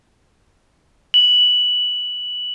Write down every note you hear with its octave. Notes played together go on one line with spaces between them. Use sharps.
F#7